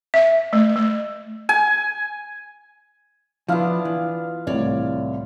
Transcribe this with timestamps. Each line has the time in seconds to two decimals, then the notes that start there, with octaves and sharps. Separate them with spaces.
0.14 E5
0.53 A3
0.76 A3
1.49 G#5
3.48 F3 B3 D4 E4 F4 F5
3.85 E3
4.47 C2 A2 C#5 D5